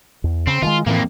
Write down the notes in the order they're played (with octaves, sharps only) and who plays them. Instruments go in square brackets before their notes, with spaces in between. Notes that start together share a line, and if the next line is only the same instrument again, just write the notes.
[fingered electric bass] E2
[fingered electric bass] C#3 [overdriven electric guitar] C4
[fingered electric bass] D#3 E3 G#3 [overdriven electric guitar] F4
[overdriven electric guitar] F2 A#3 [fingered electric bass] A2 E3